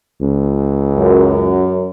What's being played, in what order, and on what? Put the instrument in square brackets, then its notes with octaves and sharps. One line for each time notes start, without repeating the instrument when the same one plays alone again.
[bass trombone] C#2
[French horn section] F#2